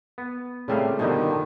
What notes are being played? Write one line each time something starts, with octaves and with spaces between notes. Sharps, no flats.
B3
A2 C#3 G3 A3 A#3 C4 F5
G2 B2 D3 D#3 F3 D#4